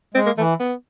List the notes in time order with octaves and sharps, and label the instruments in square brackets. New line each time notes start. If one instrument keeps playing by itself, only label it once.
[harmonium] G#3 [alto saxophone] C4
[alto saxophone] A#3
[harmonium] E3 [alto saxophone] A3
[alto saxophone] B3